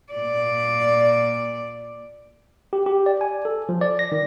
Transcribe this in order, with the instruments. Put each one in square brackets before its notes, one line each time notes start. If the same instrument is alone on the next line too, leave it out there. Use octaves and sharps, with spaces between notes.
[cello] A#2 D5
[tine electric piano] G4
G4
D5
G#5
A4
F3
D5
A#6
D#3